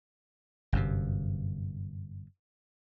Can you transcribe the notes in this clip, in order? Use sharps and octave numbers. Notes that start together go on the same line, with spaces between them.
G1 F#2 C3